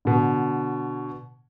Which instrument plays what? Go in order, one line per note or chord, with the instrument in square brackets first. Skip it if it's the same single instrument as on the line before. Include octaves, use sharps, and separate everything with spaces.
[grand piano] B2 D3